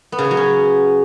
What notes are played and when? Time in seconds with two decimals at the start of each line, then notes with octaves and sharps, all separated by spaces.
0.12 B3
0.19 C#3
0.25 C#4
0.31 F#3
0.37 C#4